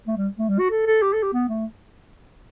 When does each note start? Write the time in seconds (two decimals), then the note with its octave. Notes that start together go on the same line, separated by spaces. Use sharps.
0.07 A3
0.17 G3
0.38 A3
0.49 G3
0.59 F#4
0.70 A4
0.86 A4
1.02 G4
1.13 A4
1.23 G4
1.33 B3
1.49 A3